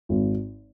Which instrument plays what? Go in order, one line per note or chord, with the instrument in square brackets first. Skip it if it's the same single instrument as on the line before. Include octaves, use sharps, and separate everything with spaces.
[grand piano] G#1